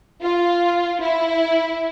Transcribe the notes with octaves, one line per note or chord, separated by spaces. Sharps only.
F4
E4